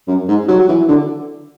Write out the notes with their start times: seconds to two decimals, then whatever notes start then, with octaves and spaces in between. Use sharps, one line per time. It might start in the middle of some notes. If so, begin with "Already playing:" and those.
0.08 F#2
0.28 G#2
0.48 F#3
0.59 F#3
0.69 E3
0.88 D3